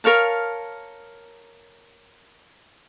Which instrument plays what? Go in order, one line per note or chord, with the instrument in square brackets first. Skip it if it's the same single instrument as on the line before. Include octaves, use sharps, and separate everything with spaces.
[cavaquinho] A#4 C#5 F5 A5